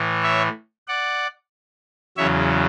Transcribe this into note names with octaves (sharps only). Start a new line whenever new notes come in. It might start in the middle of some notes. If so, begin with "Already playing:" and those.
Already playing: A2 E3
C#5 E5
D5 F#5
E2 C#3 F#3 C#5 E5